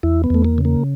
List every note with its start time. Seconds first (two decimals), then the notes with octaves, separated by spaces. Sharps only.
0.03 E2 E4
0.24 B3
0.30 E2 A3
0.45 A#3
0.58 C#3
0.65 A#3